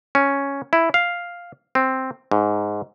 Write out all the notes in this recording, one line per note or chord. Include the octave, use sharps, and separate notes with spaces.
C#4
E4
F5
C4
G#2